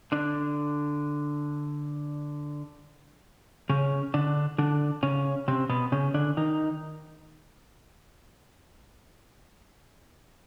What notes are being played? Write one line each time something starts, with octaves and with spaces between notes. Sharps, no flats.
D3 D4
C#3 C#4
D3 D4
D3 D4
C#3 C#4
C3 C4
B2 B3
C#3 C#4
D3 D4
D#3 D#4